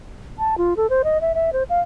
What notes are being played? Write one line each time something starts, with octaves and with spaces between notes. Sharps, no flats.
A5
F4
A4
C5
D#5
E5
E5
C5
F5